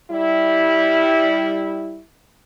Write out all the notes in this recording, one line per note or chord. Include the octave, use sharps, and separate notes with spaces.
G3 E4